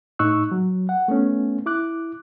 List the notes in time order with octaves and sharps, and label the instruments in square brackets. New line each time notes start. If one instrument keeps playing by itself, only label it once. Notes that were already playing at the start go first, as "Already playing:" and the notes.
[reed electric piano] A2 D#4 C#6 E6 F#6
F#3
F#5
A3 B3 C#4
E4 D6 F#6